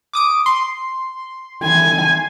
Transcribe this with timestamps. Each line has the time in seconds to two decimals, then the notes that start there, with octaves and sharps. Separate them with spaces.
0.13 D6 D#6 D7
0.46 C6
1.63 G#5